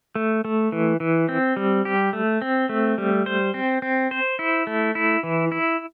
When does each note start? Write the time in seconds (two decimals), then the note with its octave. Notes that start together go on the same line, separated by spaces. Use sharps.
0.15 A3
0.45 A3
0.72 E3
1.00 E3
1.29 C4
1.56 G3
1.85 G4
2.13 A3
2.42 C4
2.69 A3
2.98 G3
3.26 C5
3.54 C4
3.82 C4
4.11 C5
4.39 E4
4.67 A3
4.95 E4
5.23 E3
5.52 E4